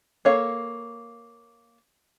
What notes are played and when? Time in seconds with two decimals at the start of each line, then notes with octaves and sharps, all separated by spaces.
0.25 A#3 A4 C#5 F5